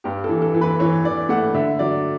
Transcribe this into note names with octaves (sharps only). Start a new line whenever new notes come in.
G2 G4
A4
E3
A4
E3
B4
E3 C#5
E3 D5
A3 F#5
D3 E5
F#3 D5